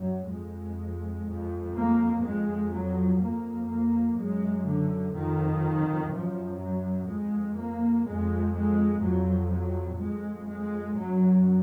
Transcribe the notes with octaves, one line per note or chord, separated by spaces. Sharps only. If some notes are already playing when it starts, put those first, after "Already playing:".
Already playing: F#2 F#3
F2 G#3
F2
A#3
F2 G#3
F#3
F2 A#3
A#3
F#2 G#3
D3
F2 D#3
F#2 F3
F#3
F2 G#3
A#3
F2 G#3
G#3
F2 F#3
F#3
F2 G#3
G#3
F#2 F#3